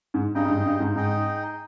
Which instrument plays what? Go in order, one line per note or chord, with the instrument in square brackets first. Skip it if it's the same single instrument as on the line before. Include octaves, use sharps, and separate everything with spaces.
[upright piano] G#2
[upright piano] G2 [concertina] D#4 G#4 D#5 G5
[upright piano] G2
G#2
G2
G#2
[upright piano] G#2 [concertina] D#4 G#4 D#5 G5